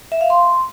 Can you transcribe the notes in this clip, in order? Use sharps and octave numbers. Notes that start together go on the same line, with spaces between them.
E5
F5
C6